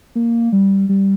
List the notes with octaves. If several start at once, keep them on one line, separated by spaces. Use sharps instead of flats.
A#3
G3
G3